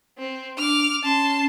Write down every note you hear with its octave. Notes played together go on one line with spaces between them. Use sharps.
C4
D4 D6 F6
C#4 A5 C6